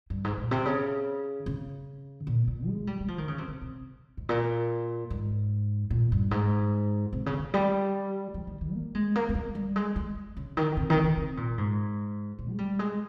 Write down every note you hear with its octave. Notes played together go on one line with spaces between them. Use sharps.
G2
G#2
A#2
C3
C#3
C#3
A#2
A#2
G#3
G3
G3
F3
D#3
C#3
C3
C3
C3
G#2
A#2
G#2
A#2
G2
G#2
C3
C#3
D#3
G3
F3
D#3
D#3
A#3
G#3
A#3
A#3
G#3
G3
G#3
G#3
C#3
D#3
C3
D#3
C#3
C3
A#2
G#2
A#2
G#3
G3
G#3